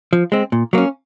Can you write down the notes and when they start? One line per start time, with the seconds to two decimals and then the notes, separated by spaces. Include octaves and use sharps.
0.13 F3
0.32 G#3 C4
0.52 A#2
0.73 F#3 A#3 C#4